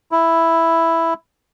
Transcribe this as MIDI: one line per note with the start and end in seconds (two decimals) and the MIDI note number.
0.12 1.14 64